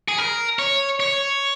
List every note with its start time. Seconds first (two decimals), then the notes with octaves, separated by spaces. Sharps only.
0.08 G#4
0.18 A#4
0.59 C#5
1.00 C#5